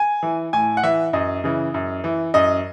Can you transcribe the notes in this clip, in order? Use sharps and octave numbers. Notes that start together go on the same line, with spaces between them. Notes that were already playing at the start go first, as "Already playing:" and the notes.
Already playing: G#5
E3
A2 G#5
F#5
E3 E5
F#2 D#5
C#3 E3
F#2
E3
F#2 D#5